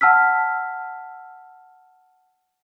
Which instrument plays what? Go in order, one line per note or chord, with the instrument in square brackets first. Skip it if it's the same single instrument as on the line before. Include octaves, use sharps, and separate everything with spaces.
[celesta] F#5 A5 E6 F6 B6